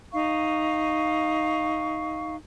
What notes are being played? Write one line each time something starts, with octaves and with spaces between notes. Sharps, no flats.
D#4 F5 C#6